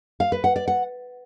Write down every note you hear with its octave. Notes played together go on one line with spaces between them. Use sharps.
F5
B4
F#5
D5
F#5